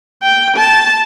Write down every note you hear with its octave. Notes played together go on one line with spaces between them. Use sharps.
G5
A5